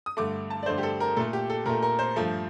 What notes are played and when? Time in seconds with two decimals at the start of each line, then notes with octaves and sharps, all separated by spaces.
0.06 D#6
0.17 G2 D3 A3 D6
0.50 A5
0.63 D5
0.66 G2 D3 A3 C5
0.78 G4
0.83 A4
1.00 A#4
1.17 A#2 A3 A4
1.33 G4
1.50 A4
1.66 A#2 A3 A#4
1.83 A#4
1.99 C5
2.16 G2 F3 A3